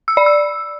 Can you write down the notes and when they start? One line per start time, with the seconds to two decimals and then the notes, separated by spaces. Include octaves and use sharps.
0.08 E6
0.17 D5
0.26 E6